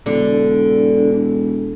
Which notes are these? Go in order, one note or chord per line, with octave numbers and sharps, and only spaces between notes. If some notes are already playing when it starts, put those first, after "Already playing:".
E1 D3